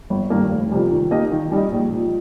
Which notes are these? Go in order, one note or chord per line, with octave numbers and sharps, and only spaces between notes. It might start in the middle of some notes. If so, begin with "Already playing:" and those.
G1
G2 D#3 A#3
F1
F2 C3 G3
D#3
A#3 D#4 G4 D#5
D#3
G3 D#4 G4 D#5
A#1
A#2 F3